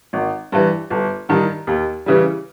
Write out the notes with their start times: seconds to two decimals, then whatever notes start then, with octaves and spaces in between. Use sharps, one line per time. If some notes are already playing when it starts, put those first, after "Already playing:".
0.13 G#1
0.52 G2 E3
0.90 G1
1.29 G2 D#3
1.67 D#2
2.06 C#3 E3 G3